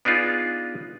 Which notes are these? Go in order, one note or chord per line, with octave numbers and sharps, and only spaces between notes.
B3 D4 D#4 F4 G#4